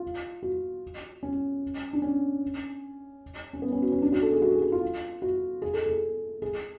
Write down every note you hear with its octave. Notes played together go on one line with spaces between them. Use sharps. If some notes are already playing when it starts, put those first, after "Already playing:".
Already playing: F4
F#4
C#4
D4
C#4
C#4
B3
C#4
F#4
C#4
D4
F#4
A4
G#4
F#4
G#4
F#4
F4
F#4
G#4
A4
G#4
G#4